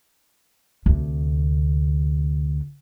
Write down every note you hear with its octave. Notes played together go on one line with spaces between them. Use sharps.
D2 C3